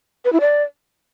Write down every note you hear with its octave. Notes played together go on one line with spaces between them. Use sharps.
B4
E4
D5